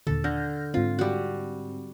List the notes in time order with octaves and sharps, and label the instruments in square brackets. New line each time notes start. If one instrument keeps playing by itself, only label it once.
[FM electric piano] D#2 A#2 D3 [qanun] A4
[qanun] D3 [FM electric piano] F6 G6 A#6
[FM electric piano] G#2 C4 [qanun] F4
[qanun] G3 F#4